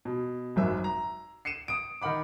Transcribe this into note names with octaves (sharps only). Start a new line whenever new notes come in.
B2
G#1 F#2 E5 E6
A#5
C7 C#7 D#7 E7
D#6 D7
D#3 A#4 F#5 B5 D6